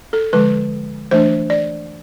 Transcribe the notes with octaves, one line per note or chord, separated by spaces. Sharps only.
A4
D3 F3 G#3 B4
E3 A3 D4 C5
D5